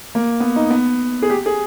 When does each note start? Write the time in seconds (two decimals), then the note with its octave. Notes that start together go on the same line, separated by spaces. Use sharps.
0.15 A#3
0.40 B3
0.56 D#4
0.70 B3
1.22 G#4
1.30 G4
1.46 G#4